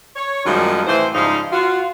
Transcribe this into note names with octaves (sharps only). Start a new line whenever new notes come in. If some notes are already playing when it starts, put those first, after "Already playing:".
C#5
F#2 A2 D#3 F3 G3 G#3
A2 C3 E3 C5
G#2 C#3 F3 G3 D#4
F4 F#4